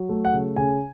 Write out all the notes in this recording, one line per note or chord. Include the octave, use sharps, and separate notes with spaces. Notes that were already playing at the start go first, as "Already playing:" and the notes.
Already playing: F#3
A3
F#5
C#3
C#3 G#5